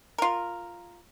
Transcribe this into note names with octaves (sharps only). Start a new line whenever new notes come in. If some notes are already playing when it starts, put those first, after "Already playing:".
F4 A#4